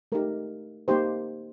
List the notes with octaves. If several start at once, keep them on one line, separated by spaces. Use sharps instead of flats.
A3 D#4 G4 A#4
A#3 D#4 G4 C5